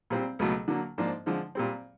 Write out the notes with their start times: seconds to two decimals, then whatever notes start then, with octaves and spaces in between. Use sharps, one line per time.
0.10 A#2 G3 C4
0.39 C#2 B2 F#3 A3
0.68 D3 F#3 A#3
0.98 G#2 F3 A#3 D4
1.26 D3 F3 G#3
1.55 A#2 G3 C4